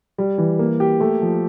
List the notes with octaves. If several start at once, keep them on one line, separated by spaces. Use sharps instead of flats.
G3
E3
A#3
G4
A3
F3